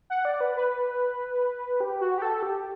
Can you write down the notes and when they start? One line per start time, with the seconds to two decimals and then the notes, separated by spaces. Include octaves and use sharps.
0.10 F#5
0.25 D5
0.41 B4
0.57 B4
1.80 G4
2.01 F#4
2.18 G4
2.22 A4
2.43 G4